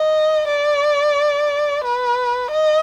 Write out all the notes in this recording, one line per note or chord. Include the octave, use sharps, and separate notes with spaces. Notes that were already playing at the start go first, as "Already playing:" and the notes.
Already playing: D#5
D5
B4
D#5